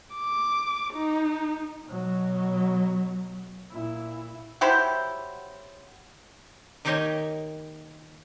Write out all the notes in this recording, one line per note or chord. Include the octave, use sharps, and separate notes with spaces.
D6
D#4
B2 F#3
A#2 E4
F#3 E4 G4 C5
D#3 A#3 D#4 G4 C#5 D#5